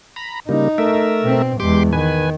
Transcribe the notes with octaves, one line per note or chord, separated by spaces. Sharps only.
A#5 B5
C#3 G3 A#3 D#4
A3 A#4 E5
B2 C4
E2 G#3 G4 C6 D6
D#3 B4 G#5